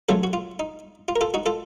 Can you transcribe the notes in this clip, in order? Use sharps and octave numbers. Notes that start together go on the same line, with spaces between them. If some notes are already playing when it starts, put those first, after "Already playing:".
C#3 F#3 A3 F4 A4
F#4
F4
D#4
F4
A#4
F4 A4
D#4 F#4
F4 A4